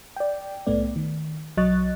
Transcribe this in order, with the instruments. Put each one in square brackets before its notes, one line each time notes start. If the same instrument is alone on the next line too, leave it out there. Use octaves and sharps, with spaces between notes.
[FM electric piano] D5 G5
C2 A2 A3 B3 D5
D#3
B1 F#3 D#5 C#6 F#6 A6